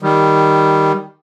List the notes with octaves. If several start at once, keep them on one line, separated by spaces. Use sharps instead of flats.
D#3 G3